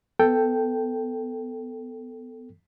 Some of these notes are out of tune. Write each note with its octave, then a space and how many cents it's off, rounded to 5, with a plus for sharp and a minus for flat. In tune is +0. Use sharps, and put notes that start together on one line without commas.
B3 +20 A4 +5 G5 +0